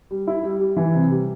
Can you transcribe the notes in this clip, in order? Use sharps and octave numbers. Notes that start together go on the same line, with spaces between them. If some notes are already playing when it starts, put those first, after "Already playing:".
G3
E4
G3
G3
E3
C3
G3